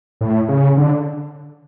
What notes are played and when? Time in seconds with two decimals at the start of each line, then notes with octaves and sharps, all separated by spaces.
0.21 A2
0.49 C#3
0.77 D3